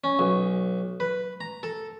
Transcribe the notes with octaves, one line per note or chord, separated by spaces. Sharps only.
C#4
B1
B4
A#5
A4